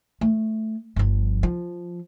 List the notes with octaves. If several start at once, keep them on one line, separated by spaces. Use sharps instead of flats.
A3
G1 F3
F3